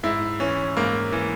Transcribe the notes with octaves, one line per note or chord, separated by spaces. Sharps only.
G#2 E4
E3 C#4
G#2 A#3
E3